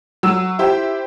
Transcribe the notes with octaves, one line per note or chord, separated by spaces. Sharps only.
F#3 E6
E4 G4 C5 G5